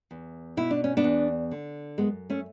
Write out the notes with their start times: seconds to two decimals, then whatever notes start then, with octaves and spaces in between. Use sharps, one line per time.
0.11 E2
0.57 B2 E4
0.71 D4
0.84 C#4
0.97 B3 D4
1.04 E2
1.51 D3
1.98 F#2 G#3 B3
2.30 A3 C#4